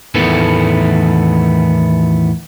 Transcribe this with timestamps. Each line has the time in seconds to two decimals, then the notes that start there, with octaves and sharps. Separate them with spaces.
0.15 E2 A2 D#3 E3 A3 B3